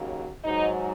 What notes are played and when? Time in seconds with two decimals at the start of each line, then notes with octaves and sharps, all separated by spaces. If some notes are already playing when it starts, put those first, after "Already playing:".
Already playing: D#2 C#3 F#3
0.44 G#2 F#3 D#4